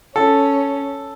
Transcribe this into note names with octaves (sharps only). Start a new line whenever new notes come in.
C#4 A4